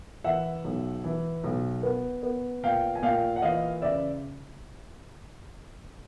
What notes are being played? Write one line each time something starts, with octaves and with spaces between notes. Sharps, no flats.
E3 E5 F#5
B1
E3
B1
B3
B3
A#2 F5 G5
G#5
A#2 F5 G5
F#5
E3 D#5 F5
C#3 D5 E5